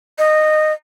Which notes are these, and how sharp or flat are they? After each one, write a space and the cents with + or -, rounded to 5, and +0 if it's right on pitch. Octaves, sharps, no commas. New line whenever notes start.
D#5 -15